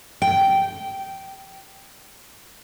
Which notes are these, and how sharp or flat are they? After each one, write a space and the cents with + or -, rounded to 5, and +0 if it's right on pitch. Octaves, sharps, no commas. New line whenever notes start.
G5 -15